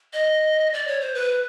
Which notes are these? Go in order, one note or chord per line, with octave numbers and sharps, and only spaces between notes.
D#5
D5
C#5
C5
B4